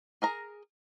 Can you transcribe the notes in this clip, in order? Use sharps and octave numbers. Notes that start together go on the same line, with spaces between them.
G#4 A#4 A#5